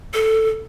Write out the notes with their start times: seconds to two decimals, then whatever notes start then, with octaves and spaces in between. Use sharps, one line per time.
0.14 A4